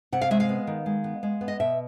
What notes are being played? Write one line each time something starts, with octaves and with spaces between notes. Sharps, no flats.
C3 F#5
F5
G#3 E5
F5
B3
D#3
G#3
B3
G#3
B3
D#5
B2 E5